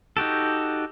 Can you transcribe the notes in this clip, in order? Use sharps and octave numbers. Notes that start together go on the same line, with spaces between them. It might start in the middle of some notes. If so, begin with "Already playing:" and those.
D#4 F#4 G4 A4